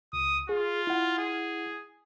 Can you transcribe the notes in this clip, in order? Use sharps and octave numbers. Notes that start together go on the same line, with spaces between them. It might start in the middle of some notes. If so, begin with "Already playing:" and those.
C#2 D#6
F4 G#4
E4 F#5
G#4